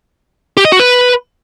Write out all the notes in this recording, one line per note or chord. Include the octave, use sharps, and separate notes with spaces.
G4
D#5
F#4
B4